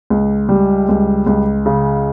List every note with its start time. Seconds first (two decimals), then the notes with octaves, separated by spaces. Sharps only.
0.10 C#2
0.49 G3
0.89 C#2
1.27 C#2
1.66 C#3